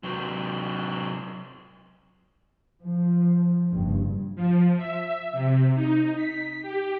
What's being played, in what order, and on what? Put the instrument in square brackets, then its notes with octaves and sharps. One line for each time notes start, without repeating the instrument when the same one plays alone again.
[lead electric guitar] C3 F#3
[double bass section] F3
F#1 G2
[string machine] F3
E5
C3
D#4
B6
G4